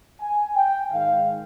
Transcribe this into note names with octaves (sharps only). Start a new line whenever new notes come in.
G#5
G5
G#2 D#3 G#3 F5